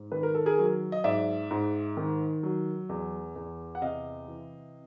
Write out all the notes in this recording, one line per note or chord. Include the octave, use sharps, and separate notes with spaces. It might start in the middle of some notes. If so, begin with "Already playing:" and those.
Already playing: G#2
D#3 B4
A#4
A4
G#4 A#4
F#3
D#5
G#2 D5 E5
G#2
D#3
F#3
E2
E2
F#5
C3 D#5 F5
E3